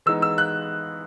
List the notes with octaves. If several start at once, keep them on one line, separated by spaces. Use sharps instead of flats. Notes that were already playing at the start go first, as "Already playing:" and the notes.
E3 G#3 B3 D#4 E6
E6
F#6